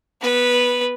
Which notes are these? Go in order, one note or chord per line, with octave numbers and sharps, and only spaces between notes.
B3 B4